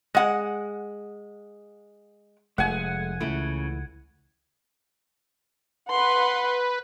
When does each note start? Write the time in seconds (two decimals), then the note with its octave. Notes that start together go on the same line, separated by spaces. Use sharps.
0.15 G#3 F#5
2.58 F1 G#3 A3 F#5 G#5
3.20 C#2 C#3 E3 A3 E4
5.89 B4 F#5 C6